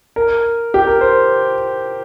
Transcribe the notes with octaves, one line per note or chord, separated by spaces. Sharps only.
A#4
G4
A#4
C5